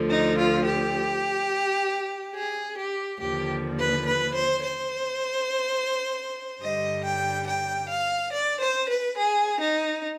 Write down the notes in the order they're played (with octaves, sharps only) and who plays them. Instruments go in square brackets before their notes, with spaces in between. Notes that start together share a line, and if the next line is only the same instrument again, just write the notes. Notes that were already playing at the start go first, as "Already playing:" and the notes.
Already playing: [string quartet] D2 D3 F3
D#4
F4
G4
G#4
G4
D#2 D3 F3 G4
B4
B4
C5
C5
G2 D3 G3 D#5
G5
G5
F5
D5
C5
B4
G#4
D#4